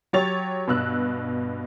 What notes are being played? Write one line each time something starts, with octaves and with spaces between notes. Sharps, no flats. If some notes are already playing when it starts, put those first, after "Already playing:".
F#3 G4 C#5 A6 F7
G2 B2 E6 F#6